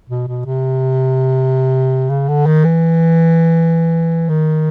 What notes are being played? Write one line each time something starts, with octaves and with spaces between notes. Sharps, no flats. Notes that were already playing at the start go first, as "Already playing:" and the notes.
B2
B2
C3
C#3
D3
D#3
E3
D#3